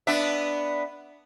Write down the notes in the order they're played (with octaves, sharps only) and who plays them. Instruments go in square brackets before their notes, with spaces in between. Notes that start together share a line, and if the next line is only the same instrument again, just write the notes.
[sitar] B3 D4 E5